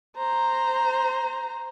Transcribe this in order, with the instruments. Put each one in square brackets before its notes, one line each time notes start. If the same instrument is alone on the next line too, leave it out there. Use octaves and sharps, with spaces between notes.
[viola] C5 A#5